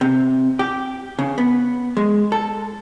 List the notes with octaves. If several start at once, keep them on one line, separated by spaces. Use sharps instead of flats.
C3
G4
C#3
B3
G#3
A4